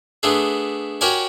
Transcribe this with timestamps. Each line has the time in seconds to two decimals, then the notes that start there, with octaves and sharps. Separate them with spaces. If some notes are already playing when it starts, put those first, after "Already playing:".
0.23 A3 B3 D4 G#4
1.01 F#4 G4 A#4 C#5 D5 G#5